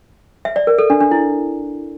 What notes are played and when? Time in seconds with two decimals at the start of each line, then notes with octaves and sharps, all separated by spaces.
0.45 E5
0.56 D5
0.67 A#4
0.78 A4
0.90 D4
1.01 D4
1.11 E4